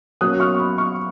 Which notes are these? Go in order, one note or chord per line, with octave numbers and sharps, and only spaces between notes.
B2 F#3 A#3 C#4 D#6 F#6
C#6 F6
C#6
B5 D#6
C#6 F6